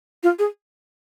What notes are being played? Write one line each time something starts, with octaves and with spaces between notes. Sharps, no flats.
F4
G#4